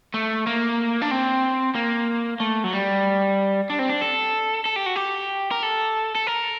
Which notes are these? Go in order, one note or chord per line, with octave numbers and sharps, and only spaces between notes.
A3
A#3
D4
C4
A#3
A3
F#3
G3
D4
C4
D4
A4
A4
G4
F#4
G4
A#4
A4
A4
A#4